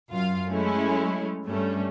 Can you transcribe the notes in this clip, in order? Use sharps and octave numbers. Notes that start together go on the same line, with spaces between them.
F#2 F4 F5
F#3 G#3 A3 C#4 E4
G2 G3 A3 C#4